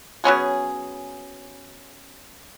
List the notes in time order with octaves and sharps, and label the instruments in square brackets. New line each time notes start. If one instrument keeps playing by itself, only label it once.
[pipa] F#3 B3 C#4 G#4